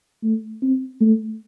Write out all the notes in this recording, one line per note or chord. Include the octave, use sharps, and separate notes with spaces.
A3
C4
A3